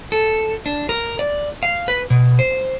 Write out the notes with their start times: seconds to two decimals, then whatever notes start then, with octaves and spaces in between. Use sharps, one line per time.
0.12 A4
0.66 D4
0.89 A#4
1.19 D5
1.63 F5
1.88 B4
2.10 B2
2.39 C5